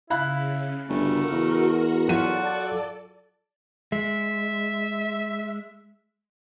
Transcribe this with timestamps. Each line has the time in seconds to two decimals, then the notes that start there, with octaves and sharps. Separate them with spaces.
0.10 C#3 E4 F5 B5 F#6
0.89 G1 A3 F#4 A#4
1.32 E2
2.08 F#3 F4 F#4 A4 D5 D#7
3.92 G#3 E5